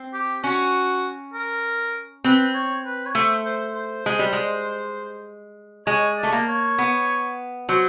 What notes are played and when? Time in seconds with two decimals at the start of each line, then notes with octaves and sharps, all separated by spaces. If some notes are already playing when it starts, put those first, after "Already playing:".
Already playing: C4
0.14 G4
0.44 C#4 F#4
1.34 A#4
2.24 C4 B4
2.54 C#5
2.85 B4
3.06 C#5
3.15 A3 C5
3.46 C5
3.75 C5
4.06 G#3
4.19 G3
4.33 G#3
5.87 G#3 C#5
6.18 D5
6.23 A3
6.33 A#3
6.48 C#5
6.78 B3
7.69 F#3 C5